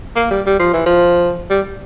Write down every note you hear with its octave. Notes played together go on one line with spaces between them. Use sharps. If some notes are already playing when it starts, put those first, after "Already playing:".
A#3
G3
G3
F3
E3
F3
G3